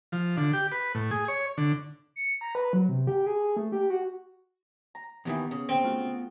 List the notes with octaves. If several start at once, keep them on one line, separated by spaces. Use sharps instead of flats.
F3
D3
G4
B4
A2
G#4
C#5
D3
C#7
A#5
B4
F#3
C3
G4
G#4
A3
G4
F#4
A#5
D#2 D#3 E3 B3
C#3
C4
A3 F4 F#4